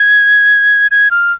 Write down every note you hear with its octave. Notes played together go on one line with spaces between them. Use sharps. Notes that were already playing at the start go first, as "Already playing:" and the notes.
Already playing: G#6
G#6
F6